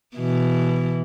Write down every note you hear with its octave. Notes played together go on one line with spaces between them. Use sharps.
B2 E3